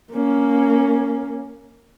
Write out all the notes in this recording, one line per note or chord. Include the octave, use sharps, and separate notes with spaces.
A#3 C#4